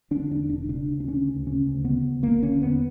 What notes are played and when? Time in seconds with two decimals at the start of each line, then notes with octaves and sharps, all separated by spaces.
0.11 D3 D4
0.31 E2 D4
0.49 E1 D4
0.69 C#3 D4
0.88 D2
1.00 D4
1.07 C#3 C#4
1.27 D2
1.47 C#3 C#4
1.66 D2
1.84 C#3 B3
2.04 D2
2.23 F#1 A#3
2.43 D3 C#4
2.62 E2 B3